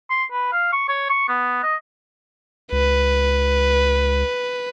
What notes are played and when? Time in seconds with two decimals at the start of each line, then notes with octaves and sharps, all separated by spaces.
0.10 C6
0.32 B4
0.52 F5
0.73 C#6
0.89 C#5
1.10 C#6
1.29 B3
1.63 D#5
2.72 C#2 B4